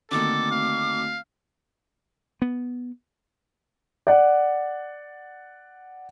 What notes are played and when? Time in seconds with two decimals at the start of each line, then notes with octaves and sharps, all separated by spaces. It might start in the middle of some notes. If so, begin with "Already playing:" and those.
0.11 D3 D#3 A3 A#3 C4 F#4 A4 D6
0.51 F5
2.42 B3
4.07 D5 F#5